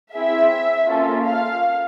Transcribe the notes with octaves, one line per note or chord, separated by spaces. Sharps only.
C4 E4 G#4 E5
A#3 C#4 F4 A4
F5